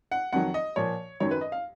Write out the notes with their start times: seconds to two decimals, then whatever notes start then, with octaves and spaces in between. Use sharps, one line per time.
0.12 F#5
0.33 F2 D#3 F#3 F#5
0.54 D#5
0.76 A#2 F3 C#5
1.20 F#2 D#3 F#3 C#5
1.31 B4
1.41 D#5
1.52 F5